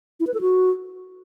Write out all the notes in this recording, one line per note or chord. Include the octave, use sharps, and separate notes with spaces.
E4
B4
A4
F#4